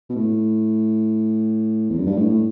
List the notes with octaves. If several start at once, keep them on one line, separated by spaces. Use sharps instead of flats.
B2
A2
E2
F#2
G2
A2
A2